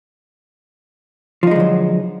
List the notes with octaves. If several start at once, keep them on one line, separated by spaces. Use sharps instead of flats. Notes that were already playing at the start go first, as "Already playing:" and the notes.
D3 F3 F#3 G#3 D#4